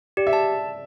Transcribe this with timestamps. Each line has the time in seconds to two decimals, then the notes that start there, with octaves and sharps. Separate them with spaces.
0.17 G4 D5
0.27 E5
0.33 A5